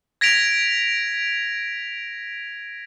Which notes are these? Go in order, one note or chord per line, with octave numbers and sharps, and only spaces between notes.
G#6 A#6 B6 D7 F7